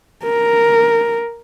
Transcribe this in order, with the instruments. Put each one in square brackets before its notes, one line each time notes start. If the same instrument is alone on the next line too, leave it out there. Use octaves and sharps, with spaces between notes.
[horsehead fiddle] A#4